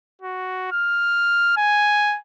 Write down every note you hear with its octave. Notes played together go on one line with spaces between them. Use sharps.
F#4
F6
G#5